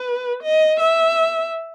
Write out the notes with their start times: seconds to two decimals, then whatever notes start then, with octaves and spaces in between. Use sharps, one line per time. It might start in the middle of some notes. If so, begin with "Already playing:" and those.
Already playing: B4
0.43 D#5
0.80 E5